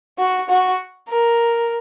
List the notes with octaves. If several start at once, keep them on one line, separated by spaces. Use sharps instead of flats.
F#4
F#4
A#4